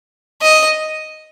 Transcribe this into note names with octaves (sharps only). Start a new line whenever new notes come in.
D#5